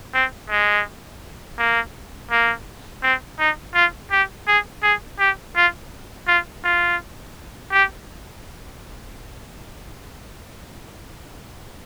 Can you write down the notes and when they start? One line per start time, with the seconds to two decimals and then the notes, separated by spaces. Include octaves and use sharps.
0.14 C4
0.50 G#3
1.58 A#3
2.31 A#3
3.03 C4
3.39 D#4
3.74 F4
4.11 G4
4.47 G#4
4.83 G#4
5.19 G4
5.56 F4
6.27 F4
6.64 F4
7.72 G4